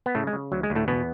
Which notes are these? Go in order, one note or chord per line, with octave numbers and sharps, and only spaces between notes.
B3
A2 C#3 A3
G#3
C#3
D2 F#3
G#3
D2
A2 A3
E2 B2 B3